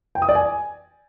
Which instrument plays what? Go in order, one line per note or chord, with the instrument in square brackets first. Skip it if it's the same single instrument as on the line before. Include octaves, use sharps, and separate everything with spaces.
[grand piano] G5
D#6
D5
G#5